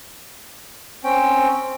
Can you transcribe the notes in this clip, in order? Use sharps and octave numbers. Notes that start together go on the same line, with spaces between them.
C4 C#4 G5